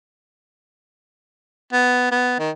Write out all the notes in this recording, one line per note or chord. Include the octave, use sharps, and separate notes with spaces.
B3
B3
D#3